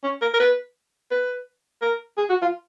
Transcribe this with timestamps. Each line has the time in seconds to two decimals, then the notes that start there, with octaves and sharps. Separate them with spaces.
0.04 C#4
0.22 A#4
0.34 A#4
0.40 B4
1.11 B4
1.82 A#4
2.18 G#4
2.30 F#4
2.42 F4